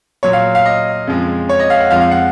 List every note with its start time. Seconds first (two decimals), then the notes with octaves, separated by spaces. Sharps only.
0.23 A#2 F#3 C#5
0.33 F5
0.55 F5
0.66 D#5
1.07 F2 C#3 F3 G#3
1.49 C#5
1.60 D#5
1.70 F5
1.81 F#5
1.91 F2 F3 G#3 F5
2.01 F5
2.11 F#5